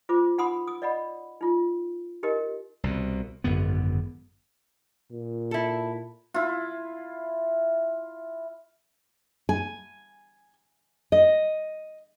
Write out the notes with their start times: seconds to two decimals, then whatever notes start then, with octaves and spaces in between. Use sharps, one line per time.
0.09 F4 C5 D6
0.38 D#4 F#5 B5 C6 D#6
0.68 D#6
0.82 D5 D#5 F#5 B5
1.41 D#4 F4
2.23 D#4 G4 A#4 D#5
2.84 C2 B2
3.44 G#1 F#2 D3 B3
5.11 A#2
5.51 E4 A4
6.34 E4 F4
9.49 G#5
11.12 D#5